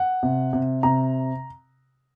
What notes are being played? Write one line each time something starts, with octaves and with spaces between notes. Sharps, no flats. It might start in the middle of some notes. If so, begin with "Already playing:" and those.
Already playing: F#5
C3
C3
C3 A#5